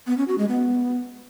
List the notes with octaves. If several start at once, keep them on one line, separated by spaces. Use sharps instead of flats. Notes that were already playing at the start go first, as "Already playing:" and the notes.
B3
C#4
F#4
G#3
B3